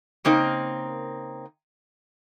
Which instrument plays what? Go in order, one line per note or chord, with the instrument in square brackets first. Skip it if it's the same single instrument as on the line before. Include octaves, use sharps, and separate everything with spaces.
[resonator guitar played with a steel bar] C#3 A#3 C4 D#4 A#4